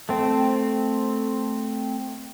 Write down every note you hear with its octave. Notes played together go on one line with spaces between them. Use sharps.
A3 C4